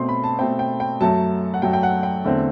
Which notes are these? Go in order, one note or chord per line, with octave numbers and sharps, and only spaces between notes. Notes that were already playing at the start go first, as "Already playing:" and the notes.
Already playing: B2 A3 C4 C6
B5
A5
B2 A3 C4 G5
G5
G5
F#2 F#3 A3 A5
F#5
F#2 F#3 A3 G5
G5
F#5
G5
E2 D3 A3 C4